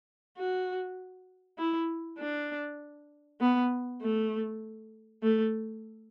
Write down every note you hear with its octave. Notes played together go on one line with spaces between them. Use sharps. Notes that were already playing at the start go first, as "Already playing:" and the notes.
F#4
E4
D4
B3
A3
A3